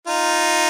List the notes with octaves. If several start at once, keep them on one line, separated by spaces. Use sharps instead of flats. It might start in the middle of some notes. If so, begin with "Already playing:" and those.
D#4 F4